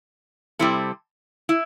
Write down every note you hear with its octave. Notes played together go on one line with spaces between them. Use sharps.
C3 G3 C4 E4 A4
E4